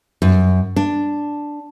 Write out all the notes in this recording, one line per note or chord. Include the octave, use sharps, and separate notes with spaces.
F#2
D4